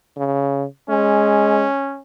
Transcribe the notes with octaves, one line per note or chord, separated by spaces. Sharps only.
C#3
G#3 C#4